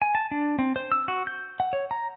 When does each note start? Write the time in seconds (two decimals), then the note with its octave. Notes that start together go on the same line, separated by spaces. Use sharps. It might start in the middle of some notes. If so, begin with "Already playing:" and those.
0.02 G#5
0.15 A5
0.31 D4
0.59 C4
0.76 C5
0.92 E6
1.08 F#4
1.27 G6
1.60 F#5
1.73 C#5
1.91 A#5